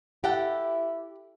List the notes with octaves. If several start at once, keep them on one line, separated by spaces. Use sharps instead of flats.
E4 G4 A4 F#5 G5